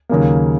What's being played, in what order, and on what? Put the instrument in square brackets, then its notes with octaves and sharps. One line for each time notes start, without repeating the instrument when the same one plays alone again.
[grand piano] D#2 C#3 F#3 A#3